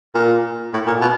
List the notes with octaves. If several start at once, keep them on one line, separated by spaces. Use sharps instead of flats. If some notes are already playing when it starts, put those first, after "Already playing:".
A#2
A2
A#2
B2